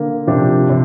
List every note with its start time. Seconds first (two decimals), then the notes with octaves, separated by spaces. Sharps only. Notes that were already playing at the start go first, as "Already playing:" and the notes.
Already playing: D3 A#3
0.27 C3 F3 D4 G4
0.70 C3